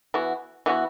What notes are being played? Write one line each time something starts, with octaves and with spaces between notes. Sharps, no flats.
E3 B3 F#4
E3 B3 F#4